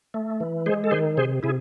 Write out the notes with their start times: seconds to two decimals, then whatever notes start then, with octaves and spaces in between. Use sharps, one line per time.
0.14 A3
0.40 E3
0.66 G#3 G#4 C5
0.84 A4
0.91 D#3 G#4 C5
1.17 C3 G#4 C5
1.43 C3 E4 G#4